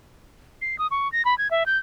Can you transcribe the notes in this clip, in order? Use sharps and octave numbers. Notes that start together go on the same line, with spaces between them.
C7
D#6
C#6
A#6
B5
G#6
E5
G6